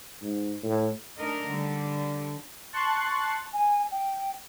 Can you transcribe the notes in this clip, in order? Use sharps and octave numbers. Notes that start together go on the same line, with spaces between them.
G#2
A2
A3 D4 D#4 A#4 D#5
D3 G3
A5 C6 C#6 F#6
G#5
G5